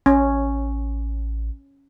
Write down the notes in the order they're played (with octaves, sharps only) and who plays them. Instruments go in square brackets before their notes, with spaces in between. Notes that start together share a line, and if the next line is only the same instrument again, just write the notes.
[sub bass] A1 [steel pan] C#4